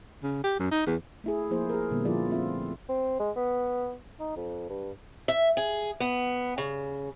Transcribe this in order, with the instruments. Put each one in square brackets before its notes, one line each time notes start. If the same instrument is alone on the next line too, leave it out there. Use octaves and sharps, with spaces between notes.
[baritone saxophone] C#3
G4
F#2
D#4
E2
[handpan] A3 E4 G#4
F3 A#3 E4 G#4 C5
G#4 A#4
A#2 D3 G3 A#3 B3
F3 E4 F4 G#4 A#4 D5
A3 C4 F4 E5
[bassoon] C4
G#3
B3
D#4
F2
G2
[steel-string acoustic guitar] E5
G#4
B3
C#3